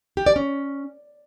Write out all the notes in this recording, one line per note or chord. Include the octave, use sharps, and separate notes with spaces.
G4
D5
C#4